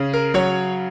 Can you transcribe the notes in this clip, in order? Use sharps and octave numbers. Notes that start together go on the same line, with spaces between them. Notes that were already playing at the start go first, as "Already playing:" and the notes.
Already playing: C#3 C#4
A#4
F#3 C#5